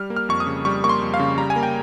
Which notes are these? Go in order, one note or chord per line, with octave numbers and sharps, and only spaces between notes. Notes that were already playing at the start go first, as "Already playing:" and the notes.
Already playing: G3 F6
A#3
F6
F2 C#6
D#6
C#3
G3 C#6
A#3 C#6
C6
F2
F5
C#3
G3 A#5
G#5
A#3
G5